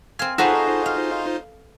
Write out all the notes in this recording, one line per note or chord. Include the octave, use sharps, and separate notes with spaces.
C4 F5 G#5
D#4 F4 F#4 G#4 A4 B4 C5 A#5
F5